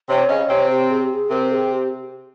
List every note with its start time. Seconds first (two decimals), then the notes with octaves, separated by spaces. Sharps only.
0.09 C3 C4 C#5
0.28 C#3 C#4 D#5
0.49 C3 C4 C#5
0.70 G4
0.90 G#4
1.02 G4
1.14 G#4
1.30 C3 C4 A#4
1.44 A#4
1.52 G#4
1.72 G4